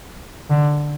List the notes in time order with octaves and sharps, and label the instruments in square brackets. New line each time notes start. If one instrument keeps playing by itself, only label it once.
[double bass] D3